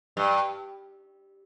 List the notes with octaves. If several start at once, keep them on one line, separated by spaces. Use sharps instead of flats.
G2